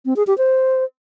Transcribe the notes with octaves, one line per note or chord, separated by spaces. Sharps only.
C4
G#4
G4
C5